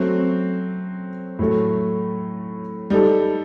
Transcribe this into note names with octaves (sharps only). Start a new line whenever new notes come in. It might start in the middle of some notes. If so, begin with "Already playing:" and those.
Already playing: F#3 A3 C4
A2 F#3 A3
G3 D#4 A4